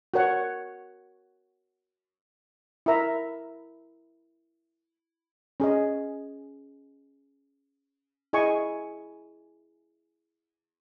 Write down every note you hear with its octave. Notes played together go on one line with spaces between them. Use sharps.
F#4 A#4 C#5 F#5
E4 A#4 E5 A#5
C#4 G#4 D#5
E4 G#4 D#5 G#5 C#6